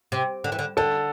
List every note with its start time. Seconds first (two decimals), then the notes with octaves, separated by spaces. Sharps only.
0.12 C3
0.44 D3
0.52 E3
0.59 D3
0.77 D3 A4